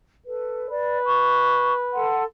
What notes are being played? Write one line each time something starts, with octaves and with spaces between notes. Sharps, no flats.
A4 B4
B4 D5
C#6
A4 F#5 C6